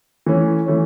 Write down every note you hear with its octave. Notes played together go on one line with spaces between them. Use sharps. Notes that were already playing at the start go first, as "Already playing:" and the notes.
E3 A3 C#4
E3 A3 C#4